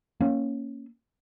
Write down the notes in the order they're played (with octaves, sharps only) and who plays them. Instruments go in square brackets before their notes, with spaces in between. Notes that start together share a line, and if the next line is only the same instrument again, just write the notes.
[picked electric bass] A#3 C#4